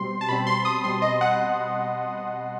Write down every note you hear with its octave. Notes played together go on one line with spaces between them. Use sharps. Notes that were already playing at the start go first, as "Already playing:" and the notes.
Already playing: B2 G3 C4 C6
A5
B2 G3 C4 B5
C6
D#6
B2 G3 C4 C6
D#5
F#5